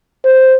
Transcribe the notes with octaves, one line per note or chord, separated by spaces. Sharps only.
C5